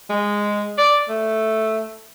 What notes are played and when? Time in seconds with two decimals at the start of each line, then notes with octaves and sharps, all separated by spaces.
0.09 G#3
0.78 D5
1.09 A3